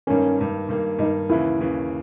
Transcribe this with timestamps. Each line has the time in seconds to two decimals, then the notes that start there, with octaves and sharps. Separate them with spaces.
0.07 G2 D#3 A#3 C#4
0.38 G2 D#3 A#3
0.69 G2 D#3 A#3
0.99 G2 D#3 A#3 D#4
1.29 D#2 C#3 E3 E4
1.60 D#2 C#3 E3